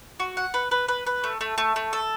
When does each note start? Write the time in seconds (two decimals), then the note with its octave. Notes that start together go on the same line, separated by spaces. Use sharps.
0.20 F#4
0.37 F#5
0.54 B4
0.71 B4
0.88 B4
1.06 B4
1.24 A3
1.41 A3
1.58 A3
1.76 A3
1.93 A4